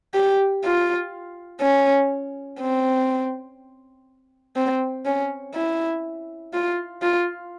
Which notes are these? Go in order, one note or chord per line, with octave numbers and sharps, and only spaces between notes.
G4
F4
C#4
C4
C4
C#4
E4
F4
F4